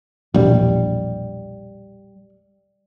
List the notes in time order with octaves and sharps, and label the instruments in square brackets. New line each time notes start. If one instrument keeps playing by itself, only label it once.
[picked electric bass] E1 A#1 [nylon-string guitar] G3